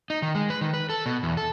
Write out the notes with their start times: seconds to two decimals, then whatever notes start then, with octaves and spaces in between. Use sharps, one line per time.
0.10 D#4
0.22 D#3
0.35 G#3
0.50 B4
0.61 D#3
0.74 B4
0.90 A4
1.06 B2
1.23 E2
1.37 A4